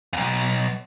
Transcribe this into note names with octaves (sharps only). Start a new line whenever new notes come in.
B1 F2